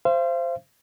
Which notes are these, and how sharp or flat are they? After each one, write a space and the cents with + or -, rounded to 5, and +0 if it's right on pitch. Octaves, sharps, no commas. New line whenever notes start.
C5 +0 F5 -40